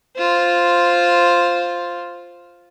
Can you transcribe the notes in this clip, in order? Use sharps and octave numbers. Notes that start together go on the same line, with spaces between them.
F4 C5